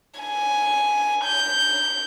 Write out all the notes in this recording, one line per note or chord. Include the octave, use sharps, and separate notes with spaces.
G#5
G6